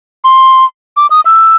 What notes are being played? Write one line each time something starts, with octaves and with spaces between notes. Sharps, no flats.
C6
D6
D#6
E6